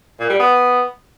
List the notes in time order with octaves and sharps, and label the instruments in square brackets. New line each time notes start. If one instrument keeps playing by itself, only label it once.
[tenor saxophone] A#2
G3
B3